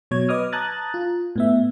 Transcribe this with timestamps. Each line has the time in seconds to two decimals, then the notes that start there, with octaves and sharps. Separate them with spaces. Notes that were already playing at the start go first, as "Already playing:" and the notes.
0.11 B2 F#3 C#5 G#6
0.29 B4 D#5 D6 D#6 F6
0.53 A5 A#5 D#6 F#6 G#6 A6
0.94 F4
1.36 A2 B3 E5